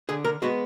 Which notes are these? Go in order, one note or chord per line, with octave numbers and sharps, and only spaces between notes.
D3 G#4
A#4
G#3 B3 F#4